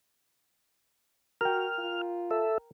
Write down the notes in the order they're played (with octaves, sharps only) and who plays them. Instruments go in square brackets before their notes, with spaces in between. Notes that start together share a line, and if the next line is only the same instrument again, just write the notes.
[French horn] F#4 [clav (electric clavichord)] A#4 G5 [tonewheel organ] F6
[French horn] F4
[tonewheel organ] A4 E5